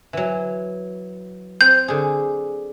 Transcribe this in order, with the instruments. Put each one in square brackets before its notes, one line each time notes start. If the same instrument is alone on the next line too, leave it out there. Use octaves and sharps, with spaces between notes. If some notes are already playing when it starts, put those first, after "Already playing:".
[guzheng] E3 F#3
[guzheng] C4 [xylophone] G6
[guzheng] D3 G#4